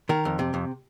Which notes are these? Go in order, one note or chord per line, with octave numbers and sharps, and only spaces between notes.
D#3 A#4
F2
C3
F2